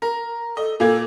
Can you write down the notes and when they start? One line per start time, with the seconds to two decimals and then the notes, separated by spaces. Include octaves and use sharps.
0.02 A#4
0.57 A4 D#5
0.80 A#2 A#3 A4 G#6